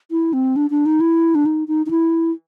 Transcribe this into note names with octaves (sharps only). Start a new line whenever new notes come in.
E4
C4
D4
D4
D#4
E4
D4
D#4
D#4
D#4
E4